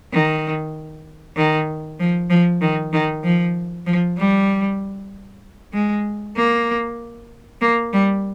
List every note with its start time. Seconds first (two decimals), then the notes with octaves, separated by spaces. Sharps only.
0.12 D#3
1.36 D#3
2.00 F3
2.30 F3
2.61 D#3
2.93 D#3
3.24 F3
3.86 F3
4.17 G3
5.74 G#3
6.36 A#3
7.61 A#3
7.93 G3